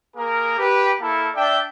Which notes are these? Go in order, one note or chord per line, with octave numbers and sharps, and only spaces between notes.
A#3 G#4 A#4
G4 B4
A#3 E4 A4
D4 D5 E5 G5